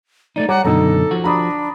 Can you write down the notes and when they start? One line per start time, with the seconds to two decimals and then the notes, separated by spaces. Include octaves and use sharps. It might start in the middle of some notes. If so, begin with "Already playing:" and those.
0.36 A3 A#3 D#4 D5
0.49 G3 C#5 F#5 A#5 D6
0.65 F#2 B2 D3 D#4 A4 A#5
1.11 F3 F#4
1.24 D4 A#5 B5 D#6